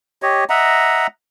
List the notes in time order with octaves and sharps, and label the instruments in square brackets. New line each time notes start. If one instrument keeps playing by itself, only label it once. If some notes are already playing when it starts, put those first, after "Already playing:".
[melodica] G4 C#5 D#5
D#5 E5 F#5 A#5